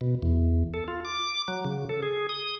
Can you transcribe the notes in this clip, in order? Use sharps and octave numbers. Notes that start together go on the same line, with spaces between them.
B2
E2
A4
F4
D6
F#3
C#3
A4
G#4
D#6